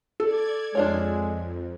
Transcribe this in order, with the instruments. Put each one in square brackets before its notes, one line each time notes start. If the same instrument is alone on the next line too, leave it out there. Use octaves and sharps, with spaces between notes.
[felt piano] A4 [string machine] D5 G#6
[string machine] F2 [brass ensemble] G#3 [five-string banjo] D4 F4 C#5